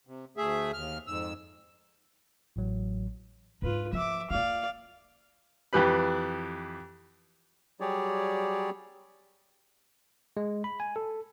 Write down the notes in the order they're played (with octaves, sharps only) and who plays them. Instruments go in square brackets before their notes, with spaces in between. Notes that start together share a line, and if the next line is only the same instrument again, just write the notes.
[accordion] C3
D2 A3 G#4 E5
D#2 F6
F2 G#2 E6
[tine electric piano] A1 A2 F#3
[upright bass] G#2 D4 [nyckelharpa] F4 B4
[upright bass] F3 [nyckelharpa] E5 D6
[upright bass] A#3 F4 [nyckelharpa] D5 F5
[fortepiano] F2 E3 G4 B4 B5
[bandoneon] F#3 G3 G4 G#4 C#5 D5
[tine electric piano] G#3
B5
G#5
A4